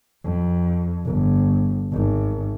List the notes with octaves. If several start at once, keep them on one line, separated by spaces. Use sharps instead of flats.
F2
G1
G#1